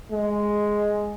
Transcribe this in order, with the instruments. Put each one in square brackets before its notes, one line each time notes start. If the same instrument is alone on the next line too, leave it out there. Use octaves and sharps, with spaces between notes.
[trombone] G#3